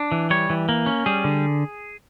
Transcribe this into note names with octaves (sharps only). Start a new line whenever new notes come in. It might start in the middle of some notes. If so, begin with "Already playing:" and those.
Already playing: D4
E3
G3 C#5
E3
A#3
C#4
G3 G#4
D3